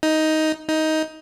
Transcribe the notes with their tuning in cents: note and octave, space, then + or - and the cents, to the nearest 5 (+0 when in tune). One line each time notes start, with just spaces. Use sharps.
D#4 +10
D#4 +15